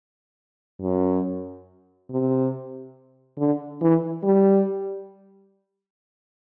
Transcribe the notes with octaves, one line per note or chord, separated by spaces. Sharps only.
F#2
C3
D3
E3
G3